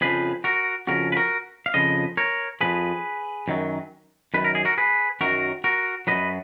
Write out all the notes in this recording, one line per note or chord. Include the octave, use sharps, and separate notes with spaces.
F2 C#3 F3 G#4 B4
F#4 A#4
F2 C#3 F3 F#4 A#4
B4
F#4 A#4
F5
F2 C#3 F3 B4 D#5
A#4 C#5
F2 C#3 F3 G#4 B4
F#2 D#3 F#3
F#2 D#3 F#3 B4
A#4
G#4
F#4 A#4
G#4 B4
F#2 D#3 F#3 F#4 A#4
F#4 A#4
F#2 D#3 F#3 B4 D#5